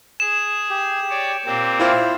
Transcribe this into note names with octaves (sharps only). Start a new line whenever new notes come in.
G#4 E7
G4
C#5 D5
A#2 A#3 C4 G4
E4 F4 C5